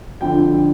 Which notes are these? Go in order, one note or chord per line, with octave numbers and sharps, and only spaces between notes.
F2 D3 F3 G5